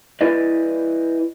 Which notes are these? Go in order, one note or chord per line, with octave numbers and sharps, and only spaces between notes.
E4 B4 D5 D#5